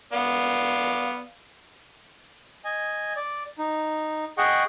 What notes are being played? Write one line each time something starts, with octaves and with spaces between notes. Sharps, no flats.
B3 D5 F5
D#5 G#5
D5
D#4
G#4 D#5 F#5 G5 C#6